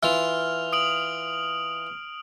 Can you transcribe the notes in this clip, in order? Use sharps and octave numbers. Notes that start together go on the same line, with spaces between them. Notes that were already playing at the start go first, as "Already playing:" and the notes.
E3 F4 F6 F7
D#6 D7 F#7